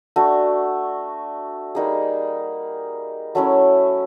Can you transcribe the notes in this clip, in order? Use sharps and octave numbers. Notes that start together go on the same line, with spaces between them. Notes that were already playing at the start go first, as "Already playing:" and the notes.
A3 D4 F#4
G3 A#3 D#4 G#4
F#3 A3 C#4 E4